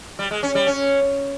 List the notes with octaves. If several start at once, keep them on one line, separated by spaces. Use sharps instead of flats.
G3
G#3
C#4
G3
C#4